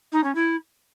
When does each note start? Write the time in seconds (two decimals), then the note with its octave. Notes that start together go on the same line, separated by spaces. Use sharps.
0.12 D#4
0.24 C#4
0.35 E4